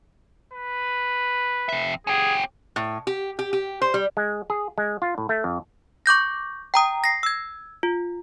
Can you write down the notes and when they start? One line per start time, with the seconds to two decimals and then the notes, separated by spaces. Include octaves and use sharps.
0.53 B4
1.69 F2 E5
2.07 C#4 G4 G#4
2.76 A2
3.07 G4
3.39 G4
3.53 G4
3.82 C5
3.94 G3
4.17 G#3
4.50 G#4
4.78 G#3
5.02 F4
5.18 A2
5.29 A3
5.44 F2
6.06 C#6 D6 G6 A#6
6.74 G5 A#5 D#6
7.04 A#6 C7
7.23 E6 G#6
7.83 F4